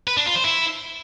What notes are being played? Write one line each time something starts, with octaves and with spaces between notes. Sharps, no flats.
B4
D4
F4
C5
E4